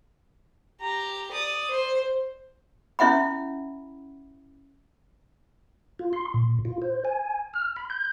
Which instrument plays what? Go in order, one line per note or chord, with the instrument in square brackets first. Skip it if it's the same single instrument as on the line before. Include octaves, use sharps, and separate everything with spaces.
[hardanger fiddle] G4 A#5
D5 D#6
C5
[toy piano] C#4 E4 E5 F#5 B5
[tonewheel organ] F4
C6
A#2
F4
C5
G#5
F6
B5
G6